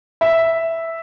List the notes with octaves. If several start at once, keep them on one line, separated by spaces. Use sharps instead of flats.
E5